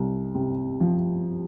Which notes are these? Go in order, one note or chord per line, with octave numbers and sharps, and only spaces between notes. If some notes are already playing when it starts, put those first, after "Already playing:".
Already playing: C2
C3
F3